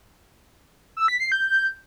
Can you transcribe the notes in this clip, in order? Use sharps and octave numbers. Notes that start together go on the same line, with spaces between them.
E6
B6
C7
G6